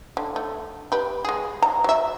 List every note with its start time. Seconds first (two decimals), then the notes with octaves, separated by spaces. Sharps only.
0.17 D3
0.36 A3
0.92 G4 B4
1.25 G#3 G#4
1.62 A#5
1.84 F#3 E5